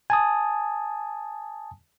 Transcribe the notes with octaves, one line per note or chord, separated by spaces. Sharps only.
G#5 A5 D#6